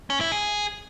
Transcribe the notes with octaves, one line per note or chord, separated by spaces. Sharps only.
C#4
E4
G#4